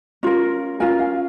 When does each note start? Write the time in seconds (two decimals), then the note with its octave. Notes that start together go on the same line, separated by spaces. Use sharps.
0.23 C#4 F4 A#4
0.80 C#4 F4 A#4 G#5
0.99 F5